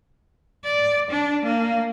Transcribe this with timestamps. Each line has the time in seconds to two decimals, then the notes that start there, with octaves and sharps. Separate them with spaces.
0.64 D5
1.11 D4
1.45 A#3